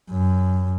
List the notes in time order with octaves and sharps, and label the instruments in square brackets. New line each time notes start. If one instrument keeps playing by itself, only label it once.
[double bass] F#2